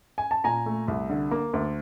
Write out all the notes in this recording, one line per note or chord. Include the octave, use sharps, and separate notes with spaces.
G#5
A5
A#2 G#5 A#5
A3
C2
D3
A#3
D2